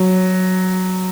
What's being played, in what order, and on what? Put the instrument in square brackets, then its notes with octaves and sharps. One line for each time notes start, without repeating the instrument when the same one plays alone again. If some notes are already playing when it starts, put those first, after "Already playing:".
Already playing: [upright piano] F#3